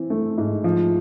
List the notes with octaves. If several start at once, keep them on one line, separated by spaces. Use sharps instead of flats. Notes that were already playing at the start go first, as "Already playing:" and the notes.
Already playing: E3 C4
A3
G#2
F3